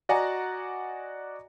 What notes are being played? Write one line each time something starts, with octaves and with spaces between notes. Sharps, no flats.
F#4 D5 D#5 F#5 G#5 A#5